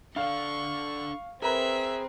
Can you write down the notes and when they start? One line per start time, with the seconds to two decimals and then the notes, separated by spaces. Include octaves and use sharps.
0.16 D4 A4 D5 F5 C#6
1.42 C4 G#4 A#4 B4 E5 A#5